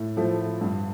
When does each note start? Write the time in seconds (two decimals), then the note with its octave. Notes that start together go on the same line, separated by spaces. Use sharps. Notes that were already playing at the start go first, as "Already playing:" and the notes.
Already playing: A2
0.17 F3 A3
0.61 G2